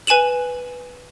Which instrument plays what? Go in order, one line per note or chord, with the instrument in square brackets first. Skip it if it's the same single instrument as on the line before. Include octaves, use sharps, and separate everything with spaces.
[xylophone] B4 G#5 D#7 E7 F#7